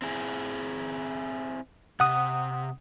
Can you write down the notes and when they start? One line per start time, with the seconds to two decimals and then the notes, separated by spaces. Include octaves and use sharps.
0.02 C4 E4 G#4
2.00 C3 F#5 D#6